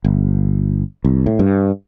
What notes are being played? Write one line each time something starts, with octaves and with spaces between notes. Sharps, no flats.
G1
C2
A2
G2